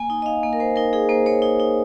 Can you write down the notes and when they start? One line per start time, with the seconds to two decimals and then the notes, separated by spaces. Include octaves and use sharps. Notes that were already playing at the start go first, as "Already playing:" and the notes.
Already playing: A#3 G#5
0.10 D#4
0.22 D#5
0.26 D#4 F5
0.43 A#3
0.53 A#4
0.60 A#3 C5
0.76 D#4 A#4
0.93 D#4 G#4
1.09 A#3 C5
1.26 A#3 C#5
1.42 D#4
1.60 D#4